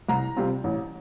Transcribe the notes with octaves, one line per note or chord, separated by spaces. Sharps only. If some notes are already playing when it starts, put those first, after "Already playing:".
C2 A#5
C3 G3 C4 F4
A1